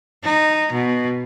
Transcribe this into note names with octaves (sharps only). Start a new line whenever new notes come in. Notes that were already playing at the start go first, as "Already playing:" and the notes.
D#4
B2